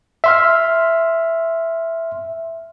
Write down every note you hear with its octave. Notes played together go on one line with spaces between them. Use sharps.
E5 C6 F6